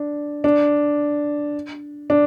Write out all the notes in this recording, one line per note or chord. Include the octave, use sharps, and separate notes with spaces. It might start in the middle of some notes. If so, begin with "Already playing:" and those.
Already playing: D4
D4
D4